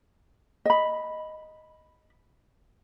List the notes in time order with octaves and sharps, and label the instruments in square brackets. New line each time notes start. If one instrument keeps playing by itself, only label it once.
[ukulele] D#5 B5